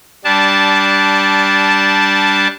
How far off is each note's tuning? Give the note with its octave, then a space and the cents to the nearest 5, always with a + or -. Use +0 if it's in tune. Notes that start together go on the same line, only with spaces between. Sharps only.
G3 +0 D4 -10 A5 -15